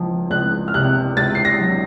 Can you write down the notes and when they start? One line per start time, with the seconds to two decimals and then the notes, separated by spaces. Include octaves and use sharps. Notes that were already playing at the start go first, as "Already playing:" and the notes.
Already playing: C#2 F3
0.30 C#2 F#6
0.68 F6
0.74 C3 F#6
1.17 C#2 A6
1.35 C7
1.45 A#6
1.59 F#3